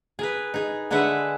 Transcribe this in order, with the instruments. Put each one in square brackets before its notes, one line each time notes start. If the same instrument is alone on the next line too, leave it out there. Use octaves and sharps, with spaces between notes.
[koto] G#4 A#4 B4
D#4 G#4
D3 G#3 G#4 B4 E5 F#5